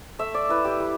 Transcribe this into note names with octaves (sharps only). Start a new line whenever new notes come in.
A3 E5
D5
E4 B4
G4
G3